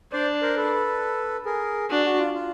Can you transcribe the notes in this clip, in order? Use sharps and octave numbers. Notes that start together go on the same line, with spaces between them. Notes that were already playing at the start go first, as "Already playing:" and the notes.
D4 C5 D5
A#4 C5
A4 B4
G#4 A#4
D4 F#4
F#4
F4
F4